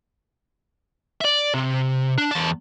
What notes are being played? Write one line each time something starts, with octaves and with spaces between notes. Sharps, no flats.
D5 E5
C3
D4
E2 A5